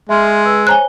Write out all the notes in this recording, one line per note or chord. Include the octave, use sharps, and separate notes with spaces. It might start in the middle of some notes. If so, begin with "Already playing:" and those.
G#3 E5 C6 F6
B4 E6
C5 C#5 G#5 A#5 F#6 G7